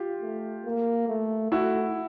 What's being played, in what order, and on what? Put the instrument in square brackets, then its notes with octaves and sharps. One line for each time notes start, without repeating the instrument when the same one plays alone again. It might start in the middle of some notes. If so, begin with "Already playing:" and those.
Already playing: [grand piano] F4 G4
[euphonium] A3
A#3
A3
[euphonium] A3 [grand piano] E4 F#4